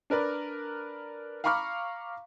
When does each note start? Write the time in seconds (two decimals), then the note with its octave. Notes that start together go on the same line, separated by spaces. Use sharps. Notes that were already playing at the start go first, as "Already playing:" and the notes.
0.10 D4 A#4 B4 D5
1.44 F5 A#5 B5 C#6 D6 F6